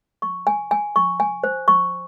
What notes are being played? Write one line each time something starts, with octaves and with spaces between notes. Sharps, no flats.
C#6
G#5
G#5
C#6
G#5
C5
C#6